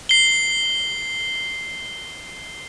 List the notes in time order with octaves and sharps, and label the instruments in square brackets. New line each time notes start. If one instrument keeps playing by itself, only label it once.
[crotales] C7 G7